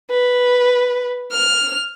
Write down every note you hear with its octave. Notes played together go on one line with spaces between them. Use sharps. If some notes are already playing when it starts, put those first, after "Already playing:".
B4
F6